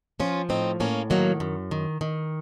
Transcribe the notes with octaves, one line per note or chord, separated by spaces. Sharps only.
F3 C#4 F4
A2 C4 D#4
A2 A#3 C#4
D#3 F#3 A#3
F#2
D#3
D#3